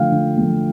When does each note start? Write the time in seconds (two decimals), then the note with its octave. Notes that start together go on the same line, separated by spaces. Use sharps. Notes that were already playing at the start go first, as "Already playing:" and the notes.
Already playing: D3 F3 A3 F5 G5
0.12 D3
0.37 F3 A3